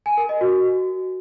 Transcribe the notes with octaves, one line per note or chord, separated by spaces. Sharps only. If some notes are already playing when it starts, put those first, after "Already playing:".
G#5
A#4
D#5
F#4